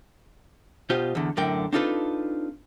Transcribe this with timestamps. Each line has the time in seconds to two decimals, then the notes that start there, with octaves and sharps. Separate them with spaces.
0.90 B2 F4 G4 C5 D#5
1.15 E2 D3
1.37 F#2 A2 D3 A#4 G5
1.73 C4 D4 D#4 F4 A4 B4